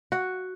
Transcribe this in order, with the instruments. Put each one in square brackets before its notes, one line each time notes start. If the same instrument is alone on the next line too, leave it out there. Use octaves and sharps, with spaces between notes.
[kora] F#4